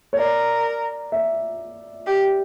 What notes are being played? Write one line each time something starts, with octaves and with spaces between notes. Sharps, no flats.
C#5
A#4 D5
E5
G4